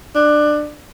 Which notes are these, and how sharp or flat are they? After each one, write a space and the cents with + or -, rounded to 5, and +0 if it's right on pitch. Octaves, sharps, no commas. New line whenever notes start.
D4 +20